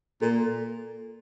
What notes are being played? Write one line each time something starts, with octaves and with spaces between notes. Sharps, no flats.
A#2 A4